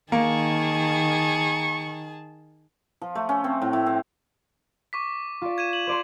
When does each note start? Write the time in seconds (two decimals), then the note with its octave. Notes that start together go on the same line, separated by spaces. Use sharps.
0.12 D#3 A#3 G#4 A5 C#6
3.01 F3
3.15 A3
3.29 C#4
3.44 C4
3.62 A2
3.73 A2
3.86 C4
4.93 C#6 D6 B6
5.42 F4 D5
5.58 G#6 D#7 E7
5.73 F#7
5.87 C5 D5 C6